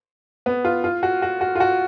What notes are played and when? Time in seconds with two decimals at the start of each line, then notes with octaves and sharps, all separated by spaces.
0.46 B3
0.65 F4
0.84 F4
1.03 F#4
1.22 F#4
1.41 F#4
1.55 F4
1.60 F#4